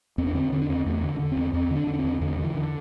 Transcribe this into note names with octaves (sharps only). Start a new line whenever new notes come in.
E2 C4
D4
D3 C4
D3 C4
D4
E2 C4
E2 A3
D3
D3
E2 C4
E2 C4
D3 D4
D3
D4
C4
E2
E2 D3
D3 E3
D3